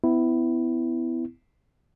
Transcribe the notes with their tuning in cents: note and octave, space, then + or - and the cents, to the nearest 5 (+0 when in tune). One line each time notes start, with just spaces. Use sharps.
B3 +35 E4 +0